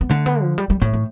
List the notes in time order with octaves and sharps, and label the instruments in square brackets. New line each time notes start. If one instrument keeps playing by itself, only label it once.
[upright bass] B3
[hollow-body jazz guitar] D3 [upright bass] A3
[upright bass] B3
F3
G3
G3
[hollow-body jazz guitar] A2 [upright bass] A3
[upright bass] A3